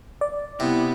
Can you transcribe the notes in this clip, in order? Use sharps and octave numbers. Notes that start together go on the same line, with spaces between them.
D5
C3 B3 E4